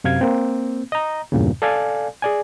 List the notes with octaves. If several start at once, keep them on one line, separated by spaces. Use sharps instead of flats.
F#2 C3 F5 G#6
A#3 C4
D#5 A#5
E2 G2 A#2 C#3
A4 D5 F5 G#5
G#4 D5 G#5